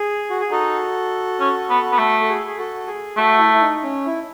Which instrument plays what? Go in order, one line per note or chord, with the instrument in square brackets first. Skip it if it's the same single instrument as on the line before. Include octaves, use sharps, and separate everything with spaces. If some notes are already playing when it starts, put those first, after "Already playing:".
Already playing: [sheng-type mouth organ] G#4
F#4
G#4
[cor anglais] D#4 [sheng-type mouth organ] F#4 A4
[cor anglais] C#4
B3
B3
A3
[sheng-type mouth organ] A4
G#4
G#4
F#4 A4
G#4
[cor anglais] A3 [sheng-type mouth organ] F#4
[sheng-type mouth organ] E4
E4
D#4
C#4
E4